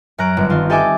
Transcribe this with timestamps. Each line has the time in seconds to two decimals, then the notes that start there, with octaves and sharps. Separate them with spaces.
0.18 F#2 A#5 F#6 D7
0.37 G1
0.50 D#3 C4 F4
0.70 G4 A4 D#5 E5 G#5 D6